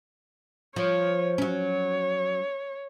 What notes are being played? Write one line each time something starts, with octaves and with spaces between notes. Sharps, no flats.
F3 C#5
F#3 C#4 C#5